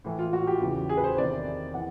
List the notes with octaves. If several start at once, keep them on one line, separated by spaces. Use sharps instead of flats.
A2 E3
F4
F#4
G4
E2 C#3 E3
G#4
B4
C5
E2 C3 D#3 D5
E3 F#5